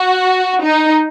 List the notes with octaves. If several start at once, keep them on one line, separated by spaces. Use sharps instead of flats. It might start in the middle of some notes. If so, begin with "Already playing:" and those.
Already playing: F#4
D#4